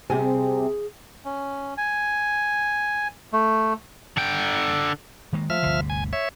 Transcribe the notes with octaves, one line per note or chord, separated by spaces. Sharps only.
C3 G3 C4 G#4 G#5
C#4
G#5
A3
D3 G5
D#3 G#3 A#3
F3 A3 E5 F6
G1 D2 C3
G#5
C#5 E5